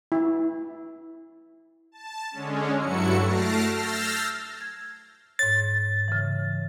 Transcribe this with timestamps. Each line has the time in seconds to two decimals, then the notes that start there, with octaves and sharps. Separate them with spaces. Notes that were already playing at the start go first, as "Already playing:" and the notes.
0.12 E4
1.92 A5
2.31 D3 G#3 C#4
2.78 G2 F#3 E4 F#4 A4 C#7
3.22 A3 A5 F6 A#6 C7 D7
3.72 E6 F6 G6 A6 A#6 C7
4.61 G#6
5.39 G#2 C#5 A6
6.08 C#3 E3